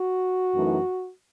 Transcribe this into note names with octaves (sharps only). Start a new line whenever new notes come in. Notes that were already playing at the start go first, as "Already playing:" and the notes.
Already playing: F#4
F#2 E3 A3 D#4